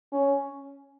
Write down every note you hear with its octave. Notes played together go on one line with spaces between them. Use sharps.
C#4